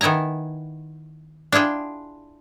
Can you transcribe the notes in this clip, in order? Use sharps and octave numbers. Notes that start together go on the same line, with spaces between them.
D#3 B3 E4 G#5 A#5
D4 E4 F4 G#4 G5